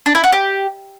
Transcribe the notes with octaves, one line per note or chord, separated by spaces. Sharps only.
D4
E4
F#4
G4